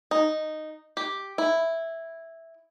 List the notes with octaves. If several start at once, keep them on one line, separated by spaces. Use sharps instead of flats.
D#4
G4
E4